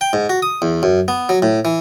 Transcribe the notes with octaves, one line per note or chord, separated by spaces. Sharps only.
G5
G#2
F#4
D#6
E2
F#2
B3
F#3
A2
E3